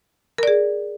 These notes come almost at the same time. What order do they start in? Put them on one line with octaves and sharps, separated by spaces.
A#4 D5 G#4